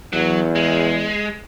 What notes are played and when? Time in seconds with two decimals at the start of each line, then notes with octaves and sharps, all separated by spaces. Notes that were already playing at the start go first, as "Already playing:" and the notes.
0.13 E2 F#3
0.55 G#3